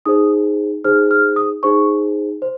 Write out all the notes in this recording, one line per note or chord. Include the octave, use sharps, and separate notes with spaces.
D#4 G#4 C5 D#6
D#4 G#4 C5 F6
F6
D#6
D#4 G#4 C5 C#6
C5